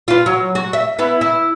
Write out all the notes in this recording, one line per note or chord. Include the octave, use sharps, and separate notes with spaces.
F4 B4
F#3
F#4
E5
B3 E4
E4